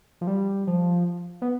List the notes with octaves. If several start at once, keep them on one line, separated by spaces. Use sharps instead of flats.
F3
G3
F3
B3